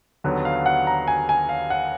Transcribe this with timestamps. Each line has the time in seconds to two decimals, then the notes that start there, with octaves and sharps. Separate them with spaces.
0.24 D#2 D3 F#3 B3
0.45 F5
0.66 F#5
0.87 A#5
1.08 G#5
1.29 G#5
1.49 F5
1.70 F#5